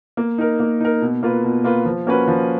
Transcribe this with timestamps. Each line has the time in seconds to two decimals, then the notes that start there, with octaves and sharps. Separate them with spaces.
0.17 A#3
0.38 D#4 A#4
0.60 A#3
0.80 D#4 A#4
1.02 B2
1.23 A#3 F4 B4
1.44 B2
1.64 A#3 F4 B4
1.85 F3
2.07 A#3 C#4 F#4 B4
2.28 F3